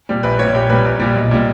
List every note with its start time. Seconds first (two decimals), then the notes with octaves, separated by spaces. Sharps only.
0.09 A#2 G3
0.23 A#1 B4
0.39 A#2 G3 C#5
0.54 A#1 G4
0.69 A#2 G3 B4
0.85 A#1
0.99 A#2 G3
1.15 B1
1.31 A#2 G3